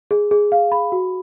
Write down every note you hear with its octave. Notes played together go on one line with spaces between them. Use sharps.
G#4
G#4
F5
B5
F#4